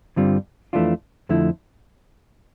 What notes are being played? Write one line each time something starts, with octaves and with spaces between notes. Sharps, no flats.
G2 D3 G3 C4 F4
F2 E3 A3 D4 F4
F2 D3 F3 A3 E4